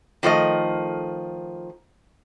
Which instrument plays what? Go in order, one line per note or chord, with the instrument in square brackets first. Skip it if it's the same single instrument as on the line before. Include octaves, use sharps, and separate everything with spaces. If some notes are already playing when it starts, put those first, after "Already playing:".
[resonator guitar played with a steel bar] D#3 F3 A3 D#5